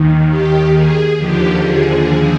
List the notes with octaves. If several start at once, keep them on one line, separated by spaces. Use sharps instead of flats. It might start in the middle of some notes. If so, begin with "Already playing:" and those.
Already playing: D#2 D#3
G4
G#4
D#2 D3 F3 G4
G#4